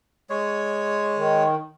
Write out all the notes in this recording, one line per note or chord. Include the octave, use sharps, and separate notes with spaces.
G#3 C#5
D#3